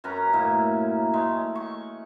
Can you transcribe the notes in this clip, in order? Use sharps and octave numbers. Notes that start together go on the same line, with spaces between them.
F#2 C#4 B4 A#5
A2 A#3 D#4 E4
G#3 A3
C#6